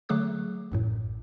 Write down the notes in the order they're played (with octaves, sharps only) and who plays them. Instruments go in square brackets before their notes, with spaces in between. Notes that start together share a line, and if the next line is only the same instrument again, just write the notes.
[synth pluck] D3 F#3 A3 G#4 D6 F#6
A1 F#2 A2